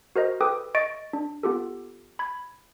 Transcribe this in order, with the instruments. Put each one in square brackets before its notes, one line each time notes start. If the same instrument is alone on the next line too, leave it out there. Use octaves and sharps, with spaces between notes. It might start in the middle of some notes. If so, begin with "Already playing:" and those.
[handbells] F#4 A#4 C5 D#5
A4 B4 G5 D6 D#6
D#5 C#6 A6 D7
D4
B3 F4 G4 A4
B5 G#6